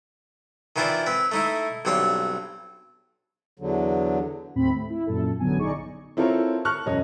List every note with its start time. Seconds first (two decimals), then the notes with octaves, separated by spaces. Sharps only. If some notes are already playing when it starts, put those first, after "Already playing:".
0.76 D#3 E3 E4 F4 C5 D5
1.06 C4 B4
1.32 A3 D#4 E4
1.85 B1 G2 C4 C#5 C6
3.59 E2 D3 F#3
4.55 D#2 A2 C4 B5
4.76 A3
4.90 E4
5.07 F#2 A#2 A4
5.39 A1 D3 F#3 B3 G#5
5.58 A#1 D#4 G#4 D5 C#6
6.17 C4 E4 F4 A4 A#4 C#5
6.65 A5 C#6 F6 F#6
6.86 E1 F#2 C#5 D#5